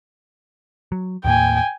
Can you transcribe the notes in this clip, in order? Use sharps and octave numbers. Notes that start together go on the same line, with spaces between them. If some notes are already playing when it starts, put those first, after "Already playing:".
F#3
D#2 A2 A#3 G5 G#5